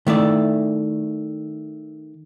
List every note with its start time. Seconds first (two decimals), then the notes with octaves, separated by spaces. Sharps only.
0.07 D#3 A3 E4 D5